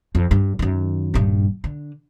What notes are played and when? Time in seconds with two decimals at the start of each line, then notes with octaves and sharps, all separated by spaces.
0.15 F2
0.31 G2
0.59 F#2 D#3
1.14 D#1 G2
1.64 D3